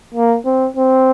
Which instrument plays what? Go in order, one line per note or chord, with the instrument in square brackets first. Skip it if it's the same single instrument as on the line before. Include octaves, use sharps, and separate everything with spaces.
[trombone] A#3
C4
C4